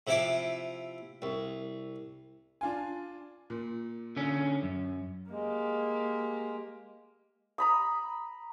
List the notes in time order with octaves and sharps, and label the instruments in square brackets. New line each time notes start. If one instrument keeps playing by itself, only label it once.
[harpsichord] C3 F3 E4 E5 D6
C2
[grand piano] D4 F4 G#5
A#2
[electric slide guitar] D3 C#4
F#2
[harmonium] G#3 [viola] A#3 G4
[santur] A#5 B5 D#6